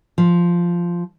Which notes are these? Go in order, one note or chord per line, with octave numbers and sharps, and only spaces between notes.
F3